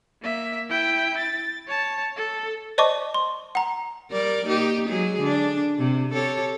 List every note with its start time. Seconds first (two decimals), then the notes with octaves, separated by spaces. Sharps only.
0.23 A#3 E5
0.70 E4 G5
1.18 A6
1.68 C#5 A5
2.17 A4
2.78 C5 D5 D#5 A5 C#6 D6
3.14 C6
3.55 F#5 A#5
4.11 G3 A#4 D5
4.45 A#3 D#4 G4
4.88 F#3 G#3 G#4
5.20 D3 D4
5.79 C3
6.13 G4 A4 C#5